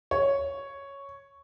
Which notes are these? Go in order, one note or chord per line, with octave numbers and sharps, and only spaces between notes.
C#5